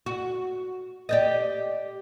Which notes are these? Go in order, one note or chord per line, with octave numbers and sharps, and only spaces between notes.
F#4
G4 D5 D#5